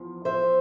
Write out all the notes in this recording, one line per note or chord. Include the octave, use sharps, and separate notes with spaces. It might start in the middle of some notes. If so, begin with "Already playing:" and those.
Already playing: E2 F3
C5 E5